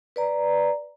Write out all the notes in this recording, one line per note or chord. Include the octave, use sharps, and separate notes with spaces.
B4 D5 A#5